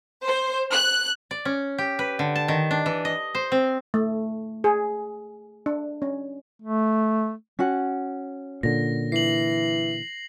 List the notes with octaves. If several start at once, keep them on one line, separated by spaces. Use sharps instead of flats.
C5
F#6
D5
C#4
G4
B4
D3
A5
D#3
D4
E3
D#5
C5
C4
A3
G#4
D4
C#4
A3
C#4 F#4 F#5
A#2 D3 A#6
E3 C7 F#7